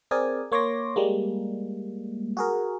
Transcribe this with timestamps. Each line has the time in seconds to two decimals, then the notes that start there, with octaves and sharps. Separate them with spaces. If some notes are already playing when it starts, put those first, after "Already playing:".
0.11 C4 G#4 A#4 D5 G#5
0.52 A#3 C#5 C6 D6 A#6
0.96 G3 G#3 A#3
2.37 F#4 G#4 A#4